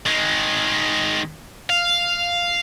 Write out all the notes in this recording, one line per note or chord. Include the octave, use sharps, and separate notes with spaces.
D#3 G#3
F5